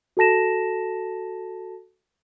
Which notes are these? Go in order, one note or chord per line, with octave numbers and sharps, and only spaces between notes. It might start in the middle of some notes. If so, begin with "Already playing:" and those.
F#4 A4 A5 A#6 E7